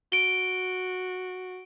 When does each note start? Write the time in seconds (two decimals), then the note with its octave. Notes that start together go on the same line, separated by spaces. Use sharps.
0.12 F#4 D7 G7